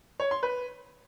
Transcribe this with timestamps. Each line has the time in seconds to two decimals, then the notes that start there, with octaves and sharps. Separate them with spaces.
0.20 C#5
0.31 C6
0.43 B4